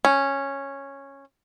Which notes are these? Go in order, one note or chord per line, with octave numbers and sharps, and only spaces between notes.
C#4